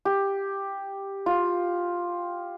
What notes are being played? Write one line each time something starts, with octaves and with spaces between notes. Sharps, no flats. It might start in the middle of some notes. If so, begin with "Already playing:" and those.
G4
F4